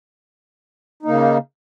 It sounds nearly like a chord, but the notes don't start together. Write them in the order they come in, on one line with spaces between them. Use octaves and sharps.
D#4 A#3 C#3